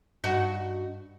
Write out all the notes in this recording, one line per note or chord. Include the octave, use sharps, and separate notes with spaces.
G2 D#4 F#4